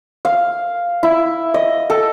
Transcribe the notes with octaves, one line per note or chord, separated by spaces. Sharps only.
F5
E4
D#5
A4